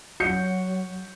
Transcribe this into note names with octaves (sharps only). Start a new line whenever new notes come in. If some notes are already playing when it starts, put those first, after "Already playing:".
F#3 F#4 G6 C#7